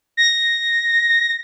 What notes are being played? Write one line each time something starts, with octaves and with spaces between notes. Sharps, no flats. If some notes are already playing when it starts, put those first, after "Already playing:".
A#6